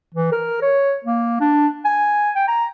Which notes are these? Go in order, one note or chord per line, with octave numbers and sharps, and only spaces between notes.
E3
A#4
C#5
A#3
D4
G#5
G5
A#5